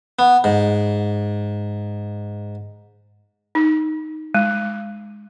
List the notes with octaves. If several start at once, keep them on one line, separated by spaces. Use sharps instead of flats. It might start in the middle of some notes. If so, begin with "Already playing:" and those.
B3
G#2
D#4
G#3